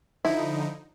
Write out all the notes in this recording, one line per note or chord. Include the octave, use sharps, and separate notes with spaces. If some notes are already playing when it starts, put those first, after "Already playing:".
D3 F3 D#4 E4